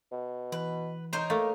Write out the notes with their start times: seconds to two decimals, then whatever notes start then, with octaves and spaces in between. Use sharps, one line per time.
0.12 B2
0.52 E3 B4
1.13 D#4 A#4 C5 C#5
1.30 A3 A#3